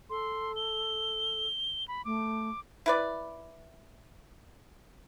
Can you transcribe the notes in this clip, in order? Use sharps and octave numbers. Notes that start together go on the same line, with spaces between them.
A4 C6
G7
B5
A3 D6
E4 B4 D5